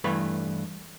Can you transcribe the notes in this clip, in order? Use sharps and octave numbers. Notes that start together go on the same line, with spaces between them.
G2 E3 A3 B4 B5